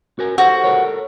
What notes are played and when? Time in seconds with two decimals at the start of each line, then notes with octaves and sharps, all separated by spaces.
0.19 F#4 A#4 G#5
0.38 F#4 G4 A4 C5
0.64 A4 A#4 C#5